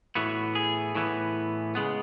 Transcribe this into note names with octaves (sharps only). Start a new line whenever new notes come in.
A2 E3 B3 F#4
G#4
A2 E3 B3
C#3 G#3 B3